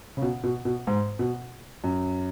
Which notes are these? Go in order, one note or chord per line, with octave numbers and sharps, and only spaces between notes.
C#3
B2
B2
B2
G#2
B2
F#2